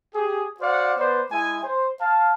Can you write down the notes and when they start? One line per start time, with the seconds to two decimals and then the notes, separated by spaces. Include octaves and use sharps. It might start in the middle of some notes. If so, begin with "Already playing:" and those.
0.15 G4 G#4
0.60 F#4 C5 D5 F5 F#5
0.98 B3 B4 C5 D5
1.31 G#3 E4 G#5
1.63 C5
2.00 F5 A5